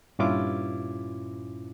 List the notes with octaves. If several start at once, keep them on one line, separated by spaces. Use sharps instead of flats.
G2 A#2 C#4 E4 F4 D6